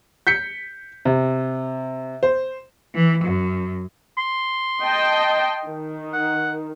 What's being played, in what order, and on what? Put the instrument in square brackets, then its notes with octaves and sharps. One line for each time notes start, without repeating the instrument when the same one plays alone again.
[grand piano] G6 B6 C#7
C3
C5
[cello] E3
F#2
[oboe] C6
[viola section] D#5 G5 A5
D#3
[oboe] F#5